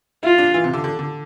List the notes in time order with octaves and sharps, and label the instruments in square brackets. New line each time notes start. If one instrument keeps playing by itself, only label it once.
[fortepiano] E4 [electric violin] F4
[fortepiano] D4
E3
C3
D3
D3
D3